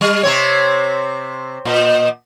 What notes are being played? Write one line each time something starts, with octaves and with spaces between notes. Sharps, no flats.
G3
C3 C4 C#5
A#2 D#5